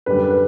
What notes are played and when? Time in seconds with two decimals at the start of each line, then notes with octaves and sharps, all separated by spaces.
0.06 F#2 D3 G3 B4
0.30 B4